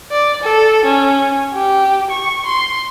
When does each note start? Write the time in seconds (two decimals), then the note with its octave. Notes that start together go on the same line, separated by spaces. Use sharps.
0.12 D5
0.43 A4
0.85 C#4
1.53 G4
2.10 C#6
2.46 C6